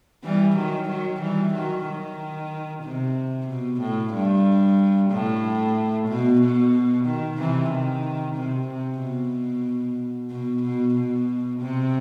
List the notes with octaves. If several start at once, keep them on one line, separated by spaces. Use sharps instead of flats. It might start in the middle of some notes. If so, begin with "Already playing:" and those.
E3 G3
D#3 F#3
D#3 F#3
E3 G3
D#3 F#3
D#3
C3
B2
A2
G2
A2
B2
B2
D#3
C3 E3
D#3
C3
C3
B2
B2
B2
B2
C3